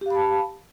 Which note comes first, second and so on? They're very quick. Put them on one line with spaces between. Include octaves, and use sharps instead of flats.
G4 F5 B5 A5